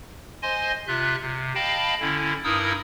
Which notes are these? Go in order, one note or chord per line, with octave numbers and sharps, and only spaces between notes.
C5 D#5 G#5 C6
C3 F4 E5 F#6
C3
D#5 F5 G5 A5 B5
D3 C#4 E4
G2 D#4 E4 A#4 D#6 E6